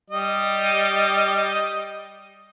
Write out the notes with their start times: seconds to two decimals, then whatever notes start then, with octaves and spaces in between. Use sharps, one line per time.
0.10 G3 D#5